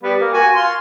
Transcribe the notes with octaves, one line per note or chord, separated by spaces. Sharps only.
G3 B3
A#3
F#4 G#5
F4 C6